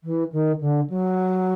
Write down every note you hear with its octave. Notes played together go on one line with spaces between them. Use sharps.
E3
D#3
D3
F#3